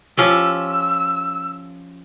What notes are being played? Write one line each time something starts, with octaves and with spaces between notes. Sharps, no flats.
F3 C#4 G4 E6